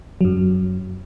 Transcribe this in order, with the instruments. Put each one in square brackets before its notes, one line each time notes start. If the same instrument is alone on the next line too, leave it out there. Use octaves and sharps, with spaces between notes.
[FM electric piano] F#2 F#3